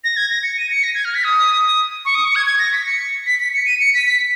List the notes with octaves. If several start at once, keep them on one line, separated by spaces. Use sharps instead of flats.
A#6
G#6
A#6
C#7
D#7
C#7
A#6
G#6
F6
B6
D#6
C#6
D#6
C#6
G#6
G#6
A#6
B6
C#7
B6
B6
C#7
D#7
C#7
B6
B6